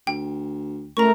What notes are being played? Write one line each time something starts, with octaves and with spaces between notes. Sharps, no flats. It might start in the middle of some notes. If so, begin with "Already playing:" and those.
D2 G5
C#2 A3 A#4 A#5 C#6